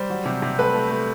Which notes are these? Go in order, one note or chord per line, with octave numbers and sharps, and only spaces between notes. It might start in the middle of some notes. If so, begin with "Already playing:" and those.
Already playing: G3 C5
F#3
C3
C3
A3 B4
A3
A3